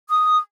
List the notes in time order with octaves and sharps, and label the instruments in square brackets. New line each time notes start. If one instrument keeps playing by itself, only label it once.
[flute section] D#6